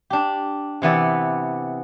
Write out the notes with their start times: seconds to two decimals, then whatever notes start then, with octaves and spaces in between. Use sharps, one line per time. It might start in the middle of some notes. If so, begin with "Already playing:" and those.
0.10 D4 G4
0.82 C3 E3 B3 D5